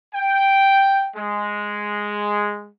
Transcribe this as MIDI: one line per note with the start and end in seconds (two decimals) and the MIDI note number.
0.14 1.09 79
1.16 2.69 56